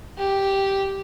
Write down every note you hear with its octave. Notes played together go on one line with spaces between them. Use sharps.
G4